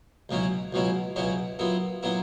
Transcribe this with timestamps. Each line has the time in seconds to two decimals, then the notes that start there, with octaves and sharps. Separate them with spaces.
0.29 C#2 B2 F#3 C#4 E4
0.73 C#2 B2 F#3 C#4 E4
1.16 C#2 B2 F#3 C#4 E4
1.59 A#2 F#3 B3 E4
2.03 A#2 F#3 B3 E4